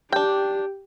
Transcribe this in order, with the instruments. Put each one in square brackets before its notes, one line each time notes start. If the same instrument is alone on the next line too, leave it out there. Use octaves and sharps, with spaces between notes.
[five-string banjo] D4 G5 [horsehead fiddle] G4